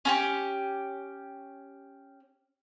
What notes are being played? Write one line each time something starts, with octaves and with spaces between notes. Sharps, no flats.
C#4 F#4 G4